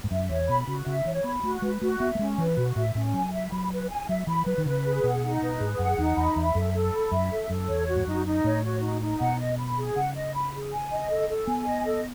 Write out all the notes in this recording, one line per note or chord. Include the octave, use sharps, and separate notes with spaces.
G#2
F#2 E5
E2 C#5
B2 B5
C#3 F#4
C#3 E5
E3 C#5
B3 B5
A3 F#4
G#3 B4
A3 F#4
B3 E5
A3
G#3 C#4
E3 B4
B2 F#4
A2 E5
A2 C#4
F#3 G#5
E5
F#3 B5
B4
G#5
F#3 E5
E3 B5
F#3 B4
D#3
C#3 B4
G#4
B2 F#5
D#4
B2 B4
G#2 G#4
F#2 F#5
E2 D#4
E2 B5
E2 E5
F#2 A4
A4
B5
F#2 E5
A4
F#2 A4
E2 C#5
F#4
G#2
F#2 D#4
D#4
A2 C#5
F#4
D#4
D#4
B2 F#5
D#5
B5
G#4
C#3 F#5
D#5
B5
G#4
G#5
D#5
A4
A4
B3 G#5
D#5
A4